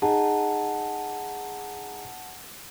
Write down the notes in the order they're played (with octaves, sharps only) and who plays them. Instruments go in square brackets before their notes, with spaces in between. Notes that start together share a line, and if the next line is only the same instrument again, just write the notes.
[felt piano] D#4 G#4 [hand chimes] F#5 A5